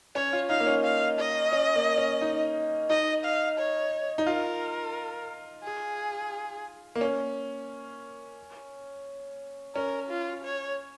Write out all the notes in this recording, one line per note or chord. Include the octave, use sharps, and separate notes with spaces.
C#4 C#5
F4
D#4 F5
A#3
C#4
F5
D#5
C#4
A#3
C#4
D#4
D#4 D#5
F5
C#5
D#4
F4 A#4
G#4
A#3
C#4
C#4 A#4
F4
C#5